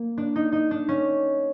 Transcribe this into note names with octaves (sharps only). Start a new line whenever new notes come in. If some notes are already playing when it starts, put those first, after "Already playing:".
Already playing: A#3
D4
D#4
D#4
D4
C#4